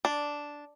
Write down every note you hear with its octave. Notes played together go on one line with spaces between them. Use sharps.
D4